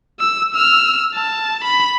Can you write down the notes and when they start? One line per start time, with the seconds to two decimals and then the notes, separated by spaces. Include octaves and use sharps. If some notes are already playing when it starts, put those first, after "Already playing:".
0.20 E6
0.54 E6 F6
1.15 A5
1.64 B5